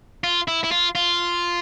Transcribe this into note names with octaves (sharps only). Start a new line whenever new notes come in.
F4
E4
E4
F4
F4